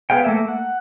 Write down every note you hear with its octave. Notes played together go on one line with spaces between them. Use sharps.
B3 G#4 F5 G5
A3 A#3 E5
F#5